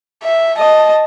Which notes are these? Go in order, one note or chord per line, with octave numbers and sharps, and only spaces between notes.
E5
D#5 A5